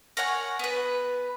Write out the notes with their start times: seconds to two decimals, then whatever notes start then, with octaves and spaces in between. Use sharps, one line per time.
0.17 A#4 C#5 F#5 G#5
0.59 B3 B4